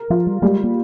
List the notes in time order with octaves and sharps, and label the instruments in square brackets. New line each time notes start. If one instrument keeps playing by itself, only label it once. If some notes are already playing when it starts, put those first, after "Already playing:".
Already playing: [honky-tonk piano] A#4
[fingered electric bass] F3 [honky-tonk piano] F4
[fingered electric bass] G3
[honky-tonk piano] G3 [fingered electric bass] G#3
[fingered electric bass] A#3